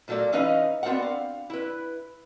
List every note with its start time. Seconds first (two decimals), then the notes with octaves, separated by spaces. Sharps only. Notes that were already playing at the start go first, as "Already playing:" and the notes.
0.08 A#2 F#3 A3 A#3 D5
0.32 E3 C#4 D#4 B4 D#5 F5
0.83 B3 C4 D4 F#4 A#4 F#5
1.02 F5
1.50 E4 B4